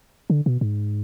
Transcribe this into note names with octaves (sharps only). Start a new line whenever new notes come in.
D3
B2
G#2